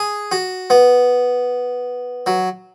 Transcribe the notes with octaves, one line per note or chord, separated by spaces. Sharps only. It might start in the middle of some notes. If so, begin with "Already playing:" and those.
Already playing: G#4
F#4
B3
F#3